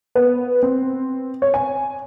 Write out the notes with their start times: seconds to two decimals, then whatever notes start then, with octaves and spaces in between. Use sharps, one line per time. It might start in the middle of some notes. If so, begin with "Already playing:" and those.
0.15 B3
0.63 C4
1.42 C#5
1.54 G#5